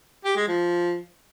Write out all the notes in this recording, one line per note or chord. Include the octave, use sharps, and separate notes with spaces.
G4
G#3
F3